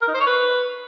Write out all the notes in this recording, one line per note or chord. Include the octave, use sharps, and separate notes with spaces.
A#4
D#4
C5
C#5
B4